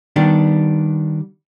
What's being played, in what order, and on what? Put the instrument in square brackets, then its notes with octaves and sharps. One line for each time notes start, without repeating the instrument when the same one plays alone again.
[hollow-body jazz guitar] D#3 G3 B3 D4